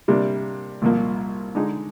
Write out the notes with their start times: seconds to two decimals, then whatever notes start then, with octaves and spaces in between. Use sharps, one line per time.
0.08 C3 G3 A#3 D4
0.82 C2 A#2 F3 A#3
1.55 D3 G#3 D#4 G#4